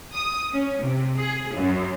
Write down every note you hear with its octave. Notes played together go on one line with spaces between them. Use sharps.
D#6
C#4
C3
G#4
F#2